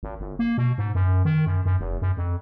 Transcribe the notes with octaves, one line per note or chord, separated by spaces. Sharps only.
G#1
G1
A#3
B2
G#2
F#2
D#3
F#2
F#2
F1
F#2
F2